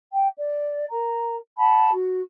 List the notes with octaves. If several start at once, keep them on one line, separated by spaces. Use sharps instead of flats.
G5
D5
A#4 A#5
F#5 A5 B5
F#4